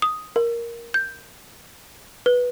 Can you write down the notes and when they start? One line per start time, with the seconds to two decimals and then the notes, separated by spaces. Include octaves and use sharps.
0.02 D#6
0.36 A#4
0.94 G6
2.26 B4